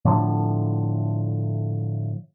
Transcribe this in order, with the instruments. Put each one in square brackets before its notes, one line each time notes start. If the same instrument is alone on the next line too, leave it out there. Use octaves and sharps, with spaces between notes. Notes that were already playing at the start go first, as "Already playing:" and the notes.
[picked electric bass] A2 D3 F3